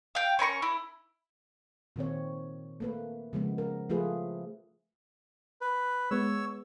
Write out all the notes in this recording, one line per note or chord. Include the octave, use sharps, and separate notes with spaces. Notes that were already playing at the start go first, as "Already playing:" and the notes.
F5 G5
C#4 A#4 B5 C#6
E4
A#2 D#3 C4 C#5
A3 A#3 B4
C#3 F3 G#3 B3
A#4
F3 A3 F4 G#4 B4
B4
G#3 B3 C#5 E6